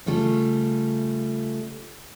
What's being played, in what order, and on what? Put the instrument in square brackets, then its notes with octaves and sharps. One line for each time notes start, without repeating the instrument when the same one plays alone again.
[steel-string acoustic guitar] C#3 G3 A3 F4 A4